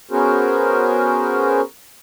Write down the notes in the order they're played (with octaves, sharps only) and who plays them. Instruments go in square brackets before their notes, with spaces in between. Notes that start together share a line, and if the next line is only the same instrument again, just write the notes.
[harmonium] B3 C#4 F#4 G#4 A#4 C5